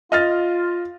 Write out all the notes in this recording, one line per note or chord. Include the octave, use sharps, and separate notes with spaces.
F4 D#5 F6 A6